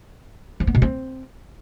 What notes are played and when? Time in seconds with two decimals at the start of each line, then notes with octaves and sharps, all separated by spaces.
0.60 F3
0.67 B3
0.75 B2
0.82 C4